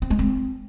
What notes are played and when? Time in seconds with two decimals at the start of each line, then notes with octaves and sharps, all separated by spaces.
0.02 C4
0.10 G#3
0.19 C4